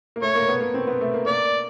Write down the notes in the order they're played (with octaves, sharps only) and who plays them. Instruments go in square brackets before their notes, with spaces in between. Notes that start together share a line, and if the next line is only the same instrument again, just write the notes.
[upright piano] A#3
[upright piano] A3 [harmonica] C#5
[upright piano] A#3
B3
A#3
C4
B3
A3
A#3
[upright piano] A#3 [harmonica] D5